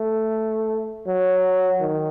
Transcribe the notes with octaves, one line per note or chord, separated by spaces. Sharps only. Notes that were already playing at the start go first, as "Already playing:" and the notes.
Already playing: A3
F#3
D#3